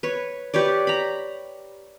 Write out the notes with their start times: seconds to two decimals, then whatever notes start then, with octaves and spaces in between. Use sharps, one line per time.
0.03 B4 C#5
0.54 G4 B4 C#5 D5
0.87 A#5 B5